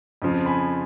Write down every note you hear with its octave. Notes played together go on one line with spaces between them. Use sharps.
F2 C#3 F3
G#5 B5